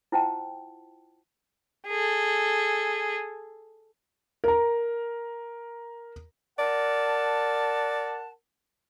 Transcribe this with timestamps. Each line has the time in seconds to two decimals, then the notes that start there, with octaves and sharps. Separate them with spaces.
0.12 E4 F4 C5 F#5 G5 A5
1.87 G#4 A4
4.44 A#4 A#5
6.59 A#4 D5 F#5 A5